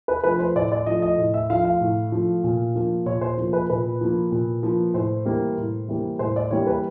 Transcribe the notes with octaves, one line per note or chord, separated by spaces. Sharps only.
B4
F3 A3 B4
C5
A2 D5
D5
F3 A3 D#5
D#5
A2
E5
F3 A3 F5
F5
A2
F3 A3
A#2
F3 A#3
A#2 C#5
C5
F3 A#3
B4
A#2 B4
F3 A#3
A#2
F3 A#3
A2 C5
E3 G3 A#3
A2
E3 G3 A#3
A2 C5
D5
E3 G3 A#3 C#5
B4